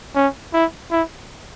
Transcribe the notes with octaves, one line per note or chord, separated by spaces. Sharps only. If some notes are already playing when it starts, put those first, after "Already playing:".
C#4
E4
E4